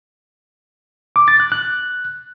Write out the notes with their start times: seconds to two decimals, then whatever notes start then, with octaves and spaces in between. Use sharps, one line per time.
1.16 D6
1.28 A6
1.40 F#6
1.52 F#6